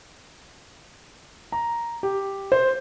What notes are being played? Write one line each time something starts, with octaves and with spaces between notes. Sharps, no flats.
A#5
G4
C5